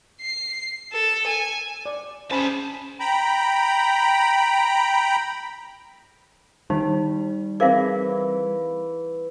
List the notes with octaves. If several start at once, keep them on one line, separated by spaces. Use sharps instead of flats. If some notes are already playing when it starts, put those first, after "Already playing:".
C7
A4
G#5
D5
C#4 G#4 C5 G#5 A5 B5
G5 A#5 B5
D#3 G3 D#4
E3 C4 G#4 A#4 C5 F5